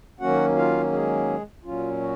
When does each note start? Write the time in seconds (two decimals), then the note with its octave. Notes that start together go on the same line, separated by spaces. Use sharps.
0.20 D#3 F#3 A#3 C#4 F#4 F#5
0.56 F4 F5
0.92 G#3 G#4
1.64 A#2 F#3 C#4 F4
2.00 F#4